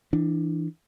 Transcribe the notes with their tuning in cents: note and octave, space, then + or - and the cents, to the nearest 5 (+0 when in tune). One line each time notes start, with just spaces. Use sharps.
E3 +0 D4 +20